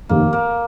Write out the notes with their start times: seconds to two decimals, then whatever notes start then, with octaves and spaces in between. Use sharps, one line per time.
0.09 F1 D#2 D#3 A#3
0.33 A#3